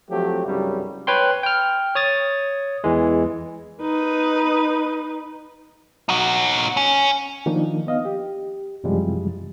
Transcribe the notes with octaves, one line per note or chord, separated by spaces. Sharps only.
F3 F#3 A3 C4 G4
C2 G2 C#3 F#3 G3
B4 C#5 G5 C6
G5 F6
C#5 D#6 A6
E2 E3 G#3
D#4 B4
D#4 F#4
C#4
D#3 F3 A#3 D4 D#4
B3 D#5 F5
G4
F#2 C3 E3 F3 G3 G#3